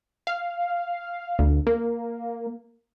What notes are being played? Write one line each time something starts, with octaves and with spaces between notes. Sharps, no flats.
F5
D2
A#3